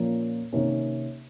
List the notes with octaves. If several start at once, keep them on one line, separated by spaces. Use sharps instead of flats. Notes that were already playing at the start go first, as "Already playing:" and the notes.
Already playing: A#2 F3 A#3 C#4
C3 D#3 A#3 C#4